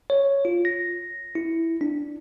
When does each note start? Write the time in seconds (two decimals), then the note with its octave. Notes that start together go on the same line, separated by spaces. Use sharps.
0.10 C#5
0.45 F4
0.65 A#6
1.35 E4
1.81 D4